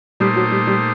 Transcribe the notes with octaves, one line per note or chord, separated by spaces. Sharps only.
A#2 G3 A3 D#4 G4 C5
F#3
G3
G3